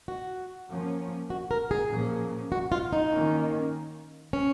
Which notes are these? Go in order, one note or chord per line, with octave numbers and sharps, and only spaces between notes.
F#4
F3 A#3 C#4
F#4
A#4
G#4
A#2 F3 A#3 C#4
F#4
F4
D#4
D#3 A#3 C#4
C#4